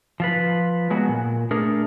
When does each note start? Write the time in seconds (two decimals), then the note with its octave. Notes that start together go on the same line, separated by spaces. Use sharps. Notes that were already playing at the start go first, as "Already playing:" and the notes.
0.20 F3 F4 B4
0.90 F#3 G#3 B3 F#4
1.09 A#2
1.51 A3 D4 G#4 A#4 D5